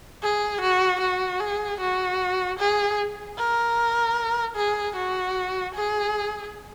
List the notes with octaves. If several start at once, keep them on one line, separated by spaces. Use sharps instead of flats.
G#4
F#4
F#4
G#4
F#4
G#4
A#4
G#4
F#4
G#4